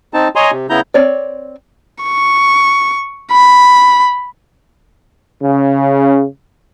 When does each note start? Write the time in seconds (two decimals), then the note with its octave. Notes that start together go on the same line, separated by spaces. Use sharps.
0.14 C4 D#4 A5
0.36 C#5 D#5 G#5 A#5 C6
0.51 C3
0.70 C#3 B3 E4 A#5 G6
0.94 C4 C#5 D5
2.04 C#6
3.32 B5
5.43 C#3